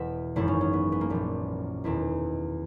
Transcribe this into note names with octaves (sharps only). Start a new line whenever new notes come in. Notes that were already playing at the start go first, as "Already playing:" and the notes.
Already playing: E1 E2 B2 E5 F#5
G#1 F#2 E3 E4
C#4
C#4
B3
B3
A#3
A#1 A#2 B3
E1 E2 D#3 E4